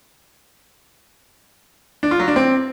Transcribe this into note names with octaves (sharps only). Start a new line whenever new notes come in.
D4
F4
F#3
D4
C4